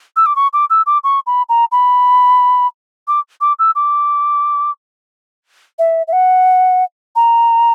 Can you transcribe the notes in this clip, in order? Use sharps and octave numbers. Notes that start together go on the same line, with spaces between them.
E6
D6
C#6
D6
E6
D6
C#6
B5
A#5
B5
D6
D6
E6
D6
E5
E5
F#5
A#5